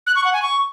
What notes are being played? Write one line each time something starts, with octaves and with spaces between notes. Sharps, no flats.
F#6
C#6
F#5
G#5
C#6